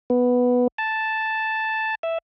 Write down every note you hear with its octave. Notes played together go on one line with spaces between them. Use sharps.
B3
A5
E5